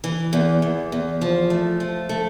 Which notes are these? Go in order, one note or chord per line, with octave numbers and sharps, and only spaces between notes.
E3
E2
E2
E2
F3
A3
F3
A3